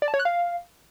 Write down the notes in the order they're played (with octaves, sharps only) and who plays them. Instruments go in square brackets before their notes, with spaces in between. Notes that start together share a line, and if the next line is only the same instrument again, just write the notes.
[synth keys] D5
A5
C#5
F#6
F5